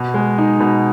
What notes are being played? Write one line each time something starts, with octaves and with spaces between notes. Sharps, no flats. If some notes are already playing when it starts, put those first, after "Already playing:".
Already playing: B2
G#3
D#4
B2